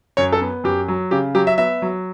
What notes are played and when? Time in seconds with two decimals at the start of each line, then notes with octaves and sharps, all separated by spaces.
0.17 F#2 C#5
0.33 A4
0.42 B3
0.64 F#2 G4
0.88 F#3
1.11 C#3 G4
1.35 F#3 G4
1.47 E5
1.58 B3 E5
1.82 F#3